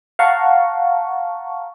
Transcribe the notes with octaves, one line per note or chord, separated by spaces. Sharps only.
F5 F#5 A5 A#5 C#6